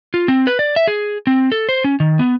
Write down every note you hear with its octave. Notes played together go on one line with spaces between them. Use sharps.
F4
C4
B4
D5
E5
G#4
C4
A4
C5
C#4
D#3
B3